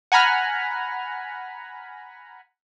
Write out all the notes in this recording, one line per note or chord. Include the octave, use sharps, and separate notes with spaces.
F#5 G#5 A#5 B5 F6